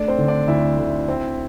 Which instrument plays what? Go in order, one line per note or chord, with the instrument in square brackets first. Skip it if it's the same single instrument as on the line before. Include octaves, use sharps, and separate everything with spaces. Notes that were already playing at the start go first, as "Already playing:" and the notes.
Already playing: [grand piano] A3 D4 D5
C4 C5
D3
D4 D5
D2 E4 E5
D2
C4